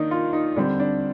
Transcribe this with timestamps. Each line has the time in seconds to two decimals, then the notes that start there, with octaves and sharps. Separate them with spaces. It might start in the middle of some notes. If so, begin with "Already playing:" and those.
Already playing: D#3 A#3 D4 D#4
0.11 F4
0.33 D#4
0.56 D3 G3 C4 D4
0.80 D4